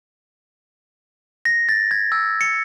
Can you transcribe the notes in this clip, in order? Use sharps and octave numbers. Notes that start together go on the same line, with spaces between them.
A#6
A6
G#6
E6
C#7